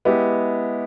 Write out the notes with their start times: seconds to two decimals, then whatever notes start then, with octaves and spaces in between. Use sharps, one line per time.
0.05 G#3 B3 E4 G4